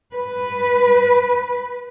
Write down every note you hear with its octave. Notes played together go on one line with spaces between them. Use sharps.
B4